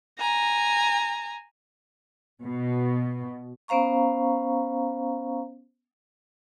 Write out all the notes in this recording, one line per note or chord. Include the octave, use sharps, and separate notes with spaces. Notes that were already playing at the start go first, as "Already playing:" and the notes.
G#5 A#5
B2
B3 C#4 C5 F5 A#5 C#6